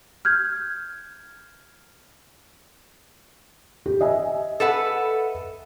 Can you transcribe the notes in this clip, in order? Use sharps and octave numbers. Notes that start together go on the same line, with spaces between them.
F6 G6 G#6
G4
D#5 E5 G#5
A4 B4 F#5